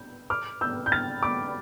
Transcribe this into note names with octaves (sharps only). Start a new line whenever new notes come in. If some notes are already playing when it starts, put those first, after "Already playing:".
Already playing: G6
D6 F6
E6 G6
G6
F6 A6
B5 D6